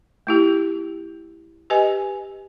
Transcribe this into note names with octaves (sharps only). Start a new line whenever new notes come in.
A3 E4 G4
G4 B4 D#5 G#5